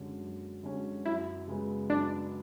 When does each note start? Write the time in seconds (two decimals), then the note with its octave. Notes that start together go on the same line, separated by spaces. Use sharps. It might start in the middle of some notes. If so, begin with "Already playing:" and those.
Already playing: F#2 D3 G#3 C#4 F#4
0.21 F#2
0.63 D3 G#3 C#4 F#4
1.05 F#2 E4
1.48 C#3 G#3 B3
1.90 F#2 D4